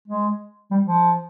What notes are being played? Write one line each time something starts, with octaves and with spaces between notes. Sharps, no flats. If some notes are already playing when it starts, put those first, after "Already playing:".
G#3
G3
F3